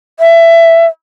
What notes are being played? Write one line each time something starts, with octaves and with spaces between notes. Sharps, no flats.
E5